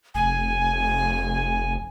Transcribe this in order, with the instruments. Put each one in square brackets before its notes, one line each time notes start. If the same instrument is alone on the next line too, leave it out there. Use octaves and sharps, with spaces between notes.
[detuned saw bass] F1 [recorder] G#5